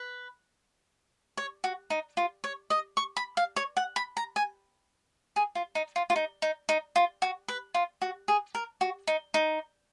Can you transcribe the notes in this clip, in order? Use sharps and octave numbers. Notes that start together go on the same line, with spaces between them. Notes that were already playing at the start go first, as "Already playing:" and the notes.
Already playing: B4
C#5
F#4
D#4
F4
C#5
D#5
C#6
B5
F5
C#5
F#5
B5
A#5
G#5
G#4
F4
D#4
F4
F4
D#4
D#4
D#4
F4
F#4
B4
F4
F#4
G#4
A#4
F#4
D#4
D#4